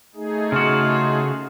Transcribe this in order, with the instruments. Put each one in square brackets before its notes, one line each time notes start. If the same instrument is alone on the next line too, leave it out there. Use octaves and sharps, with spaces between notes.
[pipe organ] A3 D#4 G#4
[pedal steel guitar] C#3 F#4 [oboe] F4